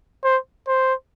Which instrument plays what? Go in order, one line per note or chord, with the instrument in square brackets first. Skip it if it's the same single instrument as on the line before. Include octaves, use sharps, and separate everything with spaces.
[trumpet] C5
C5